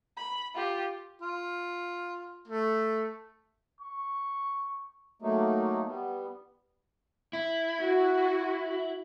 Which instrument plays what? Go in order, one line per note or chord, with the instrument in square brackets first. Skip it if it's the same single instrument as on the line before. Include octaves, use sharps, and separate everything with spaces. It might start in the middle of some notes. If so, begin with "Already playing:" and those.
[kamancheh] B5
F4 G4
[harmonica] F4
A3
[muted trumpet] C#6
[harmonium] F#3 A3 A#3 D#4
G3 B3
[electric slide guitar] E4
[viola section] F#4